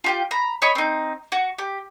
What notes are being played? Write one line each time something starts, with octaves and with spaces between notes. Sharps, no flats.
F4 G4 G5
A#5 B5
C#5 D#5 B5 C#6
C4 D#4
F#4
G4